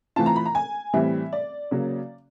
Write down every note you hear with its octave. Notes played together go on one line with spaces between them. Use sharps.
E3 A3 C4 F4 A5
A#5
B5
A#5
G#5
A2 E3 G3 C4 E5
D5
C#3 F#3 A#3